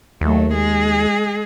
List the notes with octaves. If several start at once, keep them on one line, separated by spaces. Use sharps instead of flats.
D#2 F#3 A3
G#3 G#4